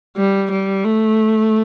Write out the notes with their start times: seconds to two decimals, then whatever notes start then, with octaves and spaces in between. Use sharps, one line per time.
0.16 G3
0.51 G3
0.84 A3